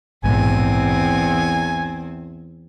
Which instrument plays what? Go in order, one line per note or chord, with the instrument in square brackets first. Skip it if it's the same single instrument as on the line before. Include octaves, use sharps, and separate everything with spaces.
[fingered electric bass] A#1 G#2 B2 [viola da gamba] E2 C4 [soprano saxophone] G#5